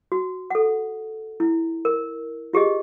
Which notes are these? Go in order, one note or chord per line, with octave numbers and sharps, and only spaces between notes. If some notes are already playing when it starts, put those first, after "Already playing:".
F#4
A4 F#5
E4
A#4
F4 G4 G#4 D#5